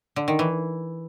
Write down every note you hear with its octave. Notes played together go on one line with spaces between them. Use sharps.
D3
D#3
E3